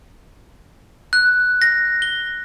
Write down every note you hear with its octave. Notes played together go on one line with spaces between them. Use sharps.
F#6
A#6
G7